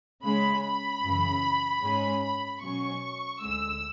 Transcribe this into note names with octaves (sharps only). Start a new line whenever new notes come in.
C#3 G#3 C#4 B5
B5
F#2 C#3 E3
G#2 G#3 C#4
B5
B2 F#3 C#4 C#6
D2 D3 G#3 E6